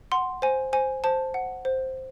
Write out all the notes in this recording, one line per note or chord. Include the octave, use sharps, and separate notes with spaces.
F#5 C6
C5 G#5
C5 G#5
C5 A5
F#5
C5